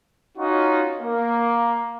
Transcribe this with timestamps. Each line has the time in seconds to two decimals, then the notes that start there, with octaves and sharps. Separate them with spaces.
0.38 C#4 D#4 F4 F#4
1.00 A#3